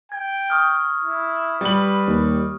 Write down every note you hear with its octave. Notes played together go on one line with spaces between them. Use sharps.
G5 G#6
C#6 D#6 F6
E4
G3 B4 F#7
D#2